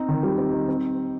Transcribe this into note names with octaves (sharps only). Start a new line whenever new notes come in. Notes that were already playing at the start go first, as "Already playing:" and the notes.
Already playing: C4 D#4
D#3
G3
C4
D#4
C4